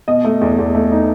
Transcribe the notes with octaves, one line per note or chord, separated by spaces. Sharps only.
B2 D#5
A3
E2
E2
A3
D#4